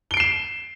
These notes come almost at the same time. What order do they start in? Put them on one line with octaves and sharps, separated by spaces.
G7 D7 C7 E7